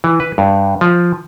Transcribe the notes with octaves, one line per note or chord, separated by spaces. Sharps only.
E3
B4
G2
F3